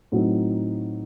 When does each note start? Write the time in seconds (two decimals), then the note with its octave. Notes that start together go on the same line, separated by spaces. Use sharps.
0.12 A2 F#3 C4 D#4